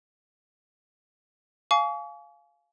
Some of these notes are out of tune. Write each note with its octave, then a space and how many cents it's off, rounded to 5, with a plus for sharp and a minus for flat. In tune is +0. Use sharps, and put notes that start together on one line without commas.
F5 -5 G#5 +30 C#6 +45